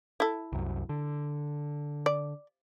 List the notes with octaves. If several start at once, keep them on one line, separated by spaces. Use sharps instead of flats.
E4 A4
C2 F#2
D3
D5